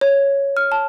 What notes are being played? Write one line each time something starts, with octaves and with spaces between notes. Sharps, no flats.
C#5
F6
A5